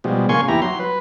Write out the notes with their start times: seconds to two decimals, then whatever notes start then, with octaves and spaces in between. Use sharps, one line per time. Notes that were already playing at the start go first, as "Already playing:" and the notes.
0.04 B2 F3 G3 G#3
0.29 A#2 C#3 A#3 G#5 C6 C#6
0.48 E2 E4 G4 A#5
0.62 F#3 C6
0.79 B4